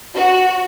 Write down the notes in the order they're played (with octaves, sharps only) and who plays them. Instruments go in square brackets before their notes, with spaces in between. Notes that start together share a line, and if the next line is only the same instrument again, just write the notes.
[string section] F#4